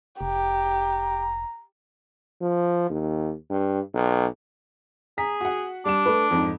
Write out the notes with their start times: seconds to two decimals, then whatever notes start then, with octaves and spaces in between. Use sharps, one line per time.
0.21 F1 G4 A#5
2.41 F3
2.90 D#2
3.50 G2
3.94 B1
5.18 G#4 A#5 B6
5.41 F#4 F#5
5.85 G3 D4 E7
6.06 A3 B4
6.31 F2 G#2